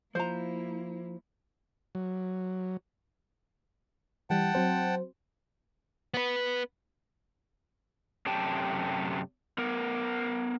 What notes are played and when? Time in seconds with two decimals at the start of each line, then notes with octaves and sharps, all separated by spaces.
0.15 F3 A#3 E4 C5 A#5
1.95 F#3
4.30 E3 G3 F#5 G5 A5
4.55 F#3 C4 C5
6.14 B3 B4
8.26 F#2 C3 A3 G4 G5 A5
9.58 B3 A#4